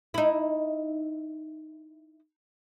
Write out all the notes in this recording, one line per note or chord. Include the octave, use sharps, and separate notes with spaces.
D#4 E4